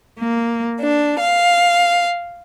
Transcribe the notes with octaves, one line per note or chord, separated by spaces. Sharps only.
A#3
D4
F5